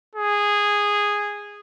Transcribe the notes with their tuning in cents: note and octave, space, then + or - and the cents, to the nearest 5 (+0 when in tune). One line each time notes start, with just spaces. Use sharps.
G#4 -10